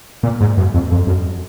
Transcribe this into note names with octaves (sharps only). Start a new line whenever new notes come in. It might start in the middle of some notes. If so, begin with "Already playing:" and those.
A#2
G#2
F#2
F2
F2
F#2